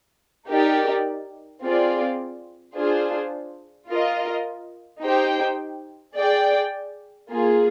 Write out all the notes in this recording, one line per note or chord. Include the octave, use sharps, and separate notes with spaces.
D#4 G4 A#4 D5
C4 F4 G#4 D5
D4 F4 G#4 C5
F4 A#4 D#5
D#4 G4 C5 G5
G#4 D5 G5
A#3 F4 G#4